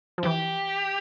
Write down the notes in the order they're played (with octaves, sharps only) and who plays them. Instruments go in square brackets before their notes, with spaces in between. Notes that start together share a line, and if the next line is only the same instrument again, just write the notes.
[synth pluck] F3
[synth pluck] E3 [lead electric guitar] G4